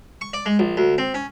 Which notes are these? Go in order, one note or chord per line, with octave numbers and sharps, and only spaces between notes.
C#6
D5
G#3
A#1
D2
C4
C#4